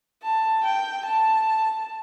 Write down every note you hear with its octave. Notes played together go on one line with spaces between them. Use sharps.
A5
G5
A5